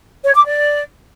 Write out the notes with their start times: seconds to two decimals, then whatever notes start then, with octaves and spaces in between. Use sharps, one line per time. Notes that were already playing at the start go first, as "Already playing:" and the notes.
0.23 C#5
0.35 D6
0.46 D5